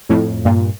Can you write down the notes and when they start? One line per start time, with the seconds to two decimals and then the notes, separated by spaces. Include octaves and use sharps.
0.09 F2 A2
0.45 G2 A#2